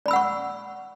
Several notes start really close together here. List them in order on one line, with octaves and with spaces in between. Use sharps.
D5 B5 E6 F#5 C#6